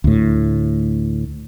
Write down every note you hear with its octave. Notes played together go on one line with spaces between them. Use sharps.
D2 A2